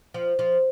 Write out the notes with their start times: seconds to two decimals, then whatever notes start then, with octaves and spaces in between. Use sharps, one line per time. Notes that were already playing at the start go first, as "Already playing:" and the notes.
0.14 F3
0.39 F3